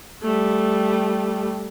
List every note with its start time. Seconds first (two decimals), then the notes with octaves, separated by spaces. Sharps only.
0.23 G3 A3